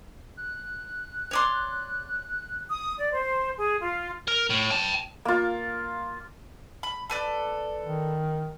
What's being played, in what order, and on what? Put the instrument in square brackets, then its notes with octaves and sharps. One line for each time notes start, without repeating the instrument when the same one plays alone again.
[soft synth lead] F#6
[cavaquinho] C#5 D5 C6
[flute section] D#6
D5
C5
G#4
F4
[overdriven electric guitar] A#4
A2
G5 A5
[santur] A#3 F4
[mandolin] B5
A4 B4 D5
[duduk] D#3